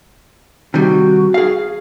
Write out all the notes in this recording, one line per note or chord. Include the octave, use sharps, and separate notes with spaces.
C3 D#3 G3 F#4
G#4 F5